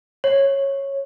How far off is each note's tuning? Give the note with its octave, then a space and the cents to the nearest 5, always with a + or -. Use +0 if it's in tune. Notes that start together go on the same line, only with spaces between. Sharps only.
C#5 -10